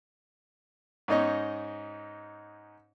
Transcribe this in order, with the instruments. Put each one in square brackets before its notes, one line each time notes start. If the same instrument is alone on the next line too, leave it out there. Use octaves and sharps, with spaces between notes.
[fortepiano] G#2 C#4 D#4 C#5 D#5